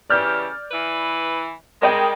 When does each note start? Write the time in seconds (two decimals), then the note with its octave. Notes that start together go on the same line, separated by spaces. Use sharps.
0.10 C#3 E3 G4 D5 F6 G6
0.71 E3 E4 B4
1.82 G3 G#3 A#4 D#5 G5